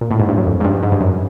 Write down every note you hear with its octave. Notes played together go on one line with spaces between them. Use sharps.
A#2
A2
G#2
G2
F#2
F2
G#2
G2
G#2
G2
F#2